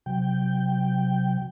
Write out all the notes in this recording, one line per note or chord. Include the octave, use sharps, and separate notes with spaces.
C3 F#3 G5